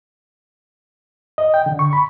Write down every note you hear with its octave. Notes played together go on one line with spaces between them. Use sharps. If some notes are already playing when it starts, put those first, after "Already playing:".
D#5
G5
D3
C#6
B5